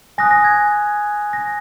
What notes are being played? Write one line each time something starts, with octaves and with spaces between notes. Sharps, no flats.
G#5 D#6 F#6 A#6
A#6
G#6
A#6